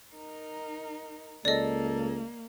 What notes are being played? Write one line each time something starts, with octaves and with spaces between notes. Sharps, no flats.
D#4 A#4
C#2 A#3 A4 D5 D#5